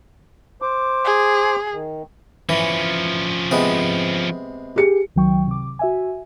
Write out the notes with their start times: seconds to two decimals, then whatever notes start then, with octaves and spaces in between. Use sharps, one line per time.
0.62 C5 D6
1.05 G#4
1.72 D#3
2.49 E3 F3 C#4
3.51 C3 G#3 B3
4.76 G4 G#4 C#7
5.16 C#2 D#3 F#3 G5 C#6
5.47 C3 D6
5.79 F#4 E5 G#5